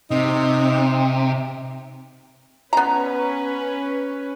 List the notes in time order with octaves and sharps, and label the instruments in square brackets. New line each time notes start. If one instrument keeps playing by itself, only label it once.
[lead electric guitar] C3 [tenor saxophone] D#4
[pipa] B3 A#5 [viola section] C#4 B4